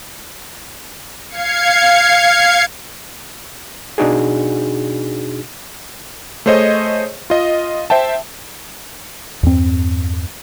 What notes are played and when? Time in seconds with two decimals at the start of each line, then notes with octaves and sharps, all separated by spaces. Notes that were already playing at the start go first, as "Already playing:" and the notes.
1.28 F5 G#6 C7 C#7
3.98 B2 D4 D#4 F#4 G#4
6.46 A3 G#4 C5 C#5 D#5
7.30 F4 D#5
7.90 C5 E5 G5 A5
9.43 E2 G2 C4